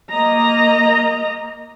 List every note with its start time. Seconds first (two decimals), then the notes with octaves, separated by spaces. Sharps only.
0.11 A#3 D#5 A#5